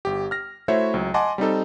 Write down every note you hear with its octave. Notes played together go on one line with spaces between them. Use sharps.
G1 G4
F6 A#6
A3 E4 F#4 C5 C#5 E5
C#2 F#3
D#5 F#5 G#5 A5 C6 D6
G3 C4 D#4 A4